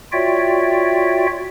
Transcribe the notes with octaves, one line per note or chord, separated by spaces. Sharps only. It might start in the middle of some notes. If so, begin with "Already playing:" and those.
F4 F#4 C#5 D5 E5 G5